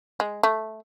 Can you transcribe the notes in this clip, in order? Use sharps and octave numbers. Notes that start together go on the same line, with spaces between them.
G#3
A3